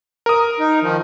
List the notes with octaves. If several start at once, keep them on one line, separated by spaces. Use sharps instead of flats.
A#4 D#6
D#4
D#3 F3